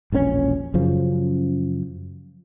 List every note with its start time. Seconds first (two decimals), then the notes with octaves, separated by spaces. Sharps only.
0.12 E1 A#1 C3 C#4
0.74 F#2 C#3 F3